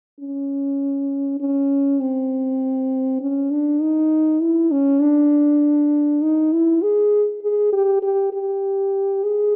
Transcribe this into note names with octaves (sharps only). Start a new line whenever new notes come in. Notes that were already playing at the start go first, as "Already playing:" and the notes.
C#4
C#4
C4
C#4
D4
D#4
E4
C#4
D4
D#4
E4
G#4
G#4
G4
G4
G4
G#4